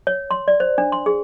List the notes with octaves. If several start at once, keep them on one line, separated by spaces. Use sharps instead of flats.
C#5
C6
D5
C5
D4
C6
G#4